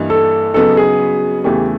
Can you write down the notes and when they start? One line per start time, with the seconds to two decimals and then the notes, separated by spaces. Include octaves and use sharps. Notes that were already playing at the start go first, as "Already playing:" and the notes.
Already playing: G2 E3 G3 A#3 D#4
0.10 A4
0.54 C#3 F#3 B3 D#4 A4
0.77 G#4
1.44 E2 C#3 E3 A3 G4